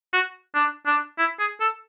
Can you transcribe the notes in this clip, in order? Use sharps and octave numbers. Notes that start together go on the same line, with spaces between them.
F#4
D4
D4
E4
G#4
A4